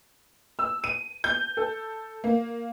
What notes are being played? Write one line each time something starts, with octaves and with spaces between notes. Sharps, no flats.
E6
D#7
G6
A4
A#3